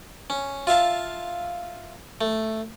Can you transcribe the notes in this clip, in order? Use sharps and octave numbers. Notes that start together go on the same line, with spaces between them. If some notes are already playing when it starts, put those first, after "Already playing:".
C#4
F4 E5 F5 A5
A3